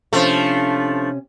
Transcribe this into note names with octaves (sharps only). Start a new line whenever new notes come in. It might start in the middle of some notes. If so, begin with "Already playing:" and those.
C3 F3 A3 C#4 D4